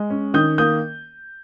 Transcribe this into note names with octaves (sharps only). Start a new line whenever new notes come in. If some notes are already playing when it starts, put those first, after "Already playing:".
Already playing: G#3
C#4
D#3 D#6 G6
A#3 D#6 G6